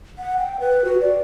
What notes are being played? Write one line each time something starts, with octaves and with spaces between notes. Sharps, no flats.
F#5
G5
B4
F#4
D5